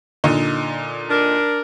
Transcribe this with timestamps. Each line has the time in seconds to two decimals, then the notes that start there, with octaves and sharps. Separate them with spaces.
0.24 A#2 D3 D#4
1.10 D4 A#4